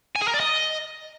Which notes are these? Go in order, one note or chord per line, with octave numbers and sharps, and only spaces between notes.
G#5
G#4
A#4
D5
D#5